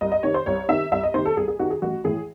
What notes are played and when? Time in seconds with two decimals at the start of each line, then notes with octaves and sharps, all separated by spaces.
0.01 C2 D#5
0.12 D#5
0.23 C3 D#3 C#5
0.34 C5
0.46 C2 C#5
0.69 C3 D#3 E5
0.92 C2 E5
1.03 D#5
1.14 C3 D#3 C5
1.25 A4
1.36 C2 G#4
1.48 G#4
1.59 C3 D#3 F#4
1.70 G#4
1.82 A1 F#4
2.04 A2 E3 G#4